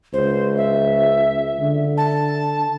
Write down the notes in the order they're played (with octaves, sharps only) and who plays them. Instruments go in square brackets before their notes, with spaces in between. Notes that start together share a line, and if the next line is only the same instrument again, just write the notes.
[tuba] C#2 [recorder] C5
[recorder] E5
[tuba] D3
[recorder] A5